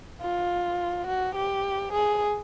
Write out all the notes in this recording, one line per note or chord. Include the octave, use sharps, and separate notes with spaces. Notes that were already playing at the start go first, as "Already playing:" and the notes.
F4
F#4
G4
G#4